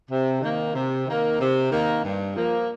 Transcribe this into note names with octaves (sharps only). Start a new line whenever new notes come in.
C3
D#3 A#3
C3
D#3 A#3
C3
D#3 A#3
G2
F3 A#3